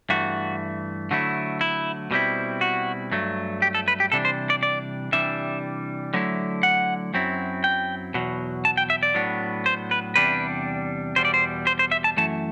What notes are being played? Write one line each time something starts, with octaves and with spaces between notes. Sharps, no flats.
G2 E3 A3 F#4
D3 F#3 A3 E4
E4
B2 G3 C4 E4
F#4
G2 F#3 A3
G4
A4
B4
G4
C3 E3 G3 D4 A4
C5
D5
D5
C3 E3 G3 D4 E5
D3 F#3 A3 E4
F#5
F#2 F#3 C4 E4
G5
E2 B2 F#3
A5
G5
E5
D5
A2 F#3 B3 D4
C5
B4
E2 C3 G3 D4 B4
E2 B2 G3 C5
D5
C5
C5
C5
E5
A5
F#2 E3 A3 A5